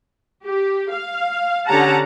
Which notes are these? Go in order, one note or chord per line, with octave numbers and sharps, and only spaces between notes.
G4
F5
D3 C#4 G4 F#5 A5 A#5